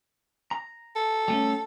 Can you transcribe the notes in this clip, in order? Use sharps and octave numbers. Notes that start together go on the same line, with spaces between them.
A#5
A4
G3 A3 C#4